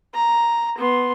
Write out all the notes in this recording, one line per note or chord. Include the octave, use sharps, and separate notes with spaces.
A#5
B3 C6